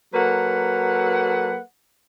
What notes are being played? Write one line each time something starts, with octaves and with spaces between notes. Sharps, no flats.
F#3 A#3 A4 B4 F#5